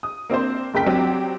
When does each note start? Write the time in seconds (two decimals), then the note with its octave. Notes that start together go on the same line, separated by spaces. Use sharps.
0.03 D#6
0.30 A#3 C4 D4 C5
0.74 F#1 C#2 A#4 G5 B6
0.86 F#3 C4 D4 G4